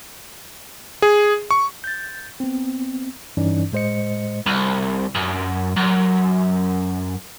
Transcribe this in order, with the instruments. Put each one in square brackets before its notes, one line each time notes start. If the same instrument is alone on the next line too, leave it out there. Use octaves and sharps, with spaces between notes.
[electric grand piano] G#4
C#6
[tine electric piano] G6 A6
B3 C4
G2 E3 C#4 D#4 D5
A2 G#3 C5 D#5 C#7
[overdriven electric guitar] C2
F#2
F#2